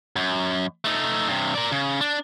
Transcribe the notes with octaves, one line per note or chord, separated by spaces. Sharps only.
F#2
A3 D#4
G2 C3
A#4 D5
C#3
D4